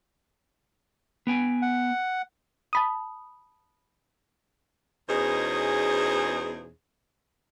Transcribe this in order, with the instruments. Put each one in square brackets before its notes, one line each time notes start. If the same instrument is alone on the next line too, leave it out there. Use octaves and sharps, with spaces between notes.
[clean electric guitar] B3 G5 G#5
[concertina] F#5
[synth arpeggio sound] A5 B5 D#6
[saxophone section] E2 B2 C#4 D#4 G#4 C5